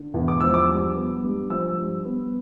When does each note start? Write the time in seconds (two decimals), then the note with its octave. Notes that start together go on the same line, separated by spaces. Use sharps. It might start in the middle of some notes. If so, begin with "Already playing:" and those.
Already playing: D3
0.14 E2
0.28 D6
0.40 F3 E6
0.54 D6
0.69 G2
0.96 B3
1.24 G2
1.50 F3 E6
1.77 G2
2.05 B3